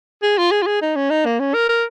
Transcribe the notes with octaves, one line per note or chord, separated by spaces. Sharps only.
G#4
F4
G#4
F4
G#4
D#4
C#4
D#4
A#3
C#4
A#4
A#4